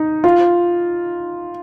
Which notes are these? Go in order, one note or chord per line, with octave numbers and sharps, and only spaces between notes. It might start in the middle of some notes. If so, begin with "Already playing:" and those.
Already playing: D#4
F4